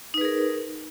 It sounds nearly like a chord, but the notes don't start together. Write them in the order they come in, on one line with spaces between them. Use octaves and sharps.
D#4 B4 G#4 A#4